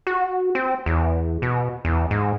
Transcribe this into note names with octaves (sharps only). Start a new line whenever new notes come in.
F#4
C4
E2
B2
E2
G#2